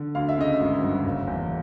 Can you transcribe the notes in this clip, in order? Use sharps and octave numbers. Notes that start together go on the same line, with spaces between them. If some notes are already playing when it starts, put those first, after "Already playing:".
Already playing: D3
D2 F5
E5
C#3 D#5
E5
G#1
G2
F#1
E2